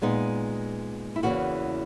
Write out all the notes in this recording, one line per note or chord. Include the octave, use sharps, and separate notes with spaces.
A#2 G#3 B3 D#4
E4
E2 C#3 E3 A#3 F#4